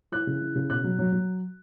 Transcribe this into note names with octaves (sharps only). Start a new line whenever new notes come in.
E3 F#6
C#3
E3
C#3
B2 F#6
F#3
F#3
F#3